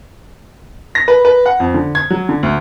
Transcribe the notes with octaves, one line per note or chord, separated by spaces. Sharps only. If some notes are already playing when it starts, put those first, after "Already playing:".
A#6
B4
B4
F#5
F2
D3
G#6
F#3
D3
D2